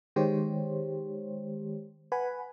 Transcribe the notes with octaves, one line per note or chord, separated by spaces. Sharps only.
D#3 G#3 G4 C5 C#5
B4 F#5 G#5 B5